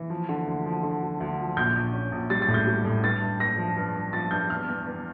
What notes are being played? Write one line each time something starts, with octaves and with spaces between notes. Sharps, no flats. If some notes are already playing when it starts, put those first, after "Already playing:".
Already playing: E3
F3
D3
D2
F3
D3
D2
D2
F3
A#1 G6
A#1
C#4
A#1
G3 A6
A6
A2
G6
G3
A2
G2 A6
G2
G2 A#6
F3
G2
G2
F3 A6
G2 G6
E2 F6
E2
E2